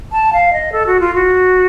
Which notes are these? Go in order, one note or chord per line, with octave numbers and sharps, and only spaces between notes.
A5
F5
D#5
A4
F#4
F4
F#4